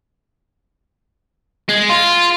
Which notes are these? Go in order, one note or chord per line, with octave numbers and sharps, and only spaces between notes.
G#3
F4